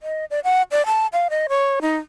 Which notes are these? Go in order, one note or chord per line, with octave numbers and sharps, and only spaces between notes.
D#5
D5
F#5
D5
A5
F5
D#5
C#5
D#4